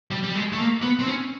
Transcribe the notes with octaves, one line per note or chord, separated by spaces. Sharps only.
G3
G3
G#3
A3
A#3
B3
C4
C#4